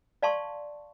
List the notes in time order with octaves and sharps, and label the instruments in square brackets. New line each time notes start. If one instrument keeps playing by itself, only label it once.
[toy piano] D5 F5 A5 C6 C#6